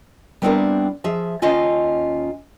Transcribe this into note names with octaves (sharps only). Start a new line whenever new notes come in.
G3 B3 C4 D4 E4 A#4
F3 G#4 E5
D#2 C#4 F4 D#5 A5